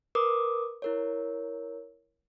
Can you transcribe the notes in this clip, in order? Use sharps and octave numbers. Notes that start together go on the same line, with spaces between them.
A#4 B4 D6 D#6
E4 A#4 C#5